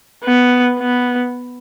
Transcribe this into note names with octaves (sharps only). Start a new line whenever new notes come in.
B3
B3